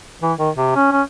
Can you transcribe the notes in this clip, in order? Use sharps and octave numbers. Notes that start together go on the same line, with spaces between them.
E3
D#3
C3
C#4
C#4